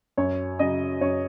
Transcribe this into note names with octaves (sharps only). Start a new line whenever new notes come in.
F#2 C#5
C#3 F#3 D#5
F#2 C#5